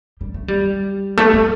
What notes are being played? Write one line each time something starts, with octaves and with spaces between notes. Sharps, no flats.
G3
A3
G3
A3
G3